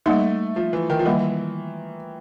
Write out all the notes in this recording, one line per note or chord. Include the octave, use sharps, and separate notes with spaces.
G3 A3 A#3 D#4
F3
E3
D#3
F3
D#3 E3 G3 A#3